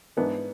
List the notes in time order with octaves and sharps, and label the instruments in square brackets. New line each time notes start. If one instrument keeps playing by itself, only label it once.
[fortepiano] G#2 E3 B3 D4